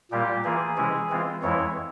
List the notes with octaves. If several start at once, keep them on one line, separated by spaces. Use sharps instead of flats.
A#2 G3 A#3 F4 G4
E3 A#3 F4 G#4
C3 E3 G#3 C#4 E4
E3 G#3 C4 F4
F2 E3 G#3 E4 C#5